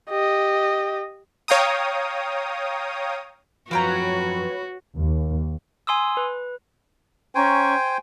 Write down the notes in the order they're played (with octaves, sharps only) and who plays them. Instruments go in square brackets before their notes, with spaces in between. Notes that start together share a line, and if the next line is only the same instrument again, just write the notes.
[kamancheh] G4 D#5
[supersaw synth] C#5 F5 G5 A#5 D#6
[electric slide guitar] F#2 F3 [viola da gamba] F#4 [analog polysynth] B4 C#5 [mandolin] F5 G5 A#5
[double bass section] D#2
[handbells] G#5 C6 D#6 E6
B4
[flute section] C#4 A#5 C#6 [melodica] C5 G5 G#5